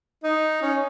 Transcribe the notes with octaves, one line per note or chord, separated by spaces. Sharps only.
D#4
C#4